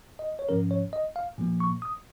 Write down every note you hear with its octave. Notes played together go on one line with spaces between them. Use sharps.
D#5
C#5
G#2 F3 C#4 A#4
C#5
D#5
F5
A#2 F3 A#3
C#6
D#6